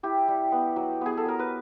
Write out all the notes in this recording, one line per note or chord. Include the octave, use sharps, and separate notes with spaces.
E4 G4
G3
B3
F#3
B3 G#4
A4
F#3 A#4
B4